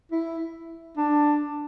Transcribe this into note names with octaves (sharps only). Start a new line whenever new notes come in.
E4
D4